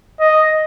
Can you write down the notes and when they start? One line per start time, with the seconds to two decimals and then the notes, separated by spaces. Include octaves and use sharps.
0.20 D#5